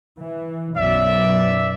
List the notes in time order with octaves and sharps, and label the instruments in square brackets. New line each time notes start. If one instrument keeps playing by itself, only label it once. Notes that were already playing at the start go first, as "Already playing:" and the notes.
[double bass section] E3
[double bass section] B1 F#2 [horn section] D5 E5